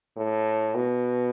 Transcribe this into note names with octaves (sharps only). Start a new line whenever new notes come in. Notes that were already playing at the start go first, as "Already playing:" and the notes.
A2
B2